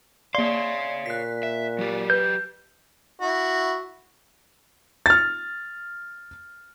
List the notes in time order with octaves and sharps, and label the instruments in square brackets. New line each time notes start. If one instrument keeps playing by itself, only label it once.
[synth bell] A#3 D5 [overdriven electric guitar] C#5 F5 [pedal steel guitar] C6
[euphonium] A#2 [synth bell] F#6 B6
[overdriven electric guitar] E5
F#3 G4
[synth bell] B4 [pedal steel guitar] G6
[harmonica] E4 F#4
[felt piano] F6 A6